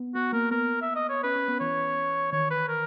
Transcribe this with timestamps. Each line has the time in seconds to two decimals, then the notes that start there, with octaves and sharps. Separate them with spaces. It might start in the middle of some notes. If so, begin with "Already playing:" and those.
Already playing: B3
0.15 B3 F#4
0.33 A#3 A#4
0.51 B3 A#4
0.82 E5
0.95 D#5
1.09 C#5
1.23 C#4 B4
1.36 C#4
1.48 B3
1.60 E3 C#5
2.32 D#3 C#5
2.51 B4
2.68 A#4